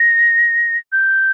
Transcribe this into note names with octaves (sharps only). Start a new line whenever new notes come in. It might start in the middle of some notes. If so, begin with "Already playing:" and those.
Already playing: A#6
G6